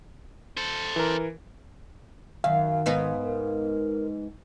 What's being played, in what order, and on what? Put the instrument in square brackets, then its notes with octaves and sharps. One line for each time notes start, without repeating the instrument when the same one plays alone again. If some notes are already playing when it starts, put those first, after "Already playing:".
[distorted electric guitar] A4 C5
[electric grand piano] E3 A#4
[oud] F#2 [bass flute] D#3 [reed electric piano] F5
[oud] G#2 B3 D#4
[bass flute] A#4